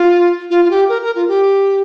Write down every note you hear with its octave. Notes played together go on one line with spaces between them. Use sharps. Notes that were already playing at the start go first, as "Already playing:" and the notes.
Already playing: F4
F4
F4
G4
A#4
A#4
F4
G4